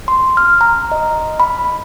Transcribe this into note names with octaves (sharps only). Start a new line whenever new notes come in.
C6
F6
A#5
D#5
B5